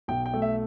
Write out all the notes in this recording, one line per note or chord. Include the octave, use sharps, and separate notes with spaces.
B1 G5
G5
A3
E5